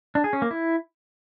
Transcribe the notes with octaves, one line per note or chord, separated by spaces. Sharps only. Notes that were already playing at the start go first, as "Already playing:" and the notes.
D4
G#4
C#4
A#3
E4